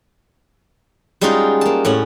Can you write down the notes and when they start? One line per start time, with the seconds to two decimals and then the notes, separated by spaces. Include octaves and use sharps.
1.21 G3 G#3 C#4 D#4 F4 F#4
1.61 A#3 A5
1.85 A2 C#4 F#5